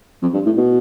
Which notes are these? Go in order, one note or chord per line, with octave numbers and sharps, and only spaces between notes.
F2
G2
A2
B2